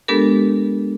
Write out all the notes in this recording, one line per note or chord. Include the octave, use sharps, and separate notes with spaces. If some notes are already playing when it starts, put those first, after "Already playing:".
G#3 B3 D4 G4 A4 A#4